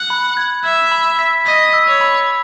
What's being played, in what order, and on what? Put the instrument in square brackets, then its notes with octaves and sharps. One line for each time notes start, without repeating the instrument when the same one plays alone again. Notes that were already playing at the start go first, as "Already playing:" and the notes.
Already playing: [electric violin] F#5
[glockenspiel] B5
G#6
[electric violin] E5 [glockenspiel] G#6
[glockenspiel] B5
B6
[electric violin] D#5 [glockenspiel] B6
[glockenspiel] E6
[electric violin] C#5
[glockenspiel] B5